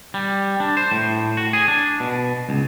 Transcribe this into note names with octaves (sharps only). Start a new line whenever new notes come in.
G3
D4
C5
A2
F#4
G#4
D4
B2
C#2